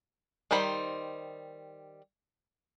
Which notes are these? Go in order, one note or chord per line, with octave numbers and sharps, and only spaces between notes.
D#3 G3 D#4 C5 B5